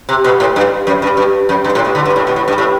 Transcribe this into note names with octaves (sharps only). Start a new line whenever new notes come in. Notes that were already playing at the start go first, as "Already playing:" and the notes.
C3
B2
A2
G2
F#2
G2
G2
F#2
G2
A2
B2
D3
G2
A2
B2
A2
G2
A2